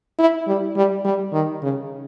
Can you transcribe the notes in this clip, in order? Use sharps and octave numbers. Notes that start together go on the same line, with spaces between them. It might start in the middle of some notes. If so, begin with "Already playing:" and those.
E4
G3
G3
G3
D#3
C#3